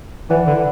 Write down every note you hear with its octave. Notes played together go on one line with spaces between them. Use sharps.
E3 E4 B4 D5 F#5
D3